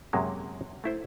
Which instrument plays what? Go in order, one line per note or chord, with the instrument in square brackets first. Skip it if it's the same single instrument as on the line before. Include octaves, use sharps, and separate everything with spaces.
[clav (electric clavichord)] F#2 C3 F#3 G#3 A#3
A3 E4 C5